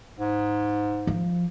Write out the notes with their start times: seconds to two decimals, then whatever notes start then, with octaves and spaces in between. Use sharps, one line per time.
0.20 G#2
1.07 F3